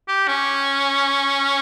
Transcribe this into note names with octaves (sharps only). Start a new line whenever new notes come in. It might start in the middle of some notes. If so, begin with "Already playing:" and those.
G4
C#4